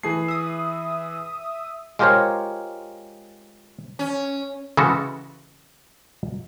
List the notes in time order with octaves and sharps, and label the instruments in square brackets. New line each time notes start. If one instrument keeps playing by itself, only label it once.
[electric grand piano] E3 G#4 C7 [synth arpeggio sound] A3
[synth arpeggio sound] E5 D#6
[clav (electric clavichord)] G#3 F4 G4 A#4 C5 C#5
[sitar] C#4
[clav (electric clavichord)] C#3 E3 G#3 E4 F#4 A4